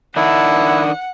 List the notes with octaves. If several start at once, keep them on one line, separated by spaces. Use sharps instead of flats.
D#3 D4 E4 F#5